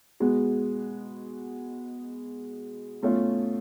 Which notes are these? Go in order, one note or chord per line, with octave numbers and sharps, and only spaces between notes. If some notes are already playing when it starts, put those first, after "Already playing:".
B2 G#3 B3 F#4
B2 A3 C#4 F4